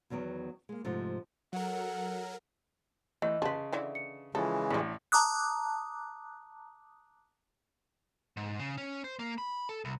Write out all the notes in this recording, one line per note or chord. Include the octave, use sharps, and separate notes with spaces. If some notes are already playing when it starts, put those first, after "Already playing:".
E2 D#3 F#3 B3 G5
G#3 A#3
G#2 C3 F3 A3
F#3 A4 A#4 F#5
E3 A3 D#5
C#3 G#4 B4 A5 C6
D3 E3 E4
C#7
C#3 E3 F3 G#3 A4
A1 A2 D3 G3
A5 A#5 D6 D#6 F#6
G#2
C#3
C#4
C5
A#3
B5
A4
C2